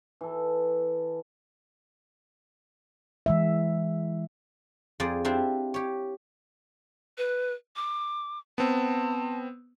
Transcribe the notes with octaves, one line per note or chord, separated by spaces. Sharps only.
E3 A4
E3 G#3 E5
F2 F3 F4 G#4 C5 D5
C4 D4 E4 F4 G4 C5
G4 C#5
B4
D6
B3 C4 A5